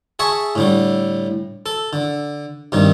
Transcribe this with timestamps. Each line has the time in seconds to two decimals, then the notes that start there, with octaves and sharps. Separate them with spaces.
0.19 G#4 E5 A5 C#6
0.55 A2 D3 G3
1.66 A4
1.93 D3
2.72 G2 C3 D#3